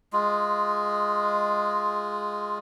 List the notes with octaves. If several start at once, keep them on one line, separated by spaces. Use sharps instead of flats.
G#3 F4